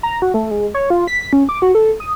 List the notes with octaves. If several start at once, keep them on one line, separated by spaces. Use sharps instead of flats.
A#5
F#4
A3
G#3
C#5
F4
B6
C#4
D6
F#4
A4
D#6